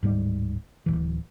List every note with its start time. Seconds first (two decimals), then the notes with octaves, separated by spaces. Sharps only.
0.03 D1 G#2 G3
0.86 D1 E3